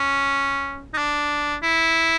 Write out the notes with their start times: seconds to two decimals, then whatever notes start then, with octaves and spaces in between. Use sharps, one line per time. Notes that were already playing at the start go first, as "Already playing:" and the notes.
Already playing: C#4
0.94 D#4
0.98 D4
1.63 E4